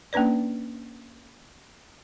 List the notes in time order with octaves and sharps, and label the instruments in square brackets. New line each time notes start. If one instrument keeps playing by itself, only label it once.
[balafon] A#3 C#4 D4 B4 D5